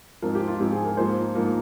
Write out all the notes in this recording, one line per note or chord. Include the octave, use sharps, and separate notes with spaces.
G#2 F3 C4 A#4
G4
F4
G#2 F3 C4 G4
G#4
A#4
G#2 F3 A#3 C5
G#2 F3 A#3